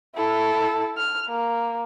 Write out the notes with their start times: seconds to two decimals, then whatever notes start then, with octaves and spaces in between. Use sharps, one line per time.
0.16 E4 A4
0.97 F6
1.29 A#3